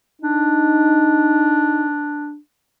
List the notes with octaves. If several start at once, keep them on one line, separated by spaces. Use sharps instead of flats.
D4 D#4